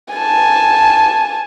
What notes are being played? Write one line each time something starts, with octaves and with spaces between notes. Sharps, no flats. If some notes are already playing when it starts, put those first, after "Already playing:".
G#5 A5